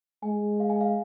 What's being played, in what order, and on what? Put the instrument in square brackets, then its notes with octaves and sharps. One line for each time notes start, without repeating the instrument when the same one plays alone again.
[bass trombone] G#3 [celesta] G#5
[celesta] F5
G#5
F5